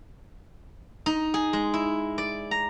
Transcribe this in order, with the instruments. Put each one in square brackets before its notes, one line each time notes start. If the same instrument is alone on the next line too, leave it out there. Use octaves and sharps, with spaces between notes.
[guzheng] D#4
G#4
G#3
E4
D5
A#5